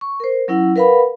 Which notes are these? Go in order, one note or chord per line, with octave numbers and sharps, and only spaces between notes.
C#6
A#4 C5
F#3 C#4 E4 F#5 E6
A#4 B4 F5 F#5 B5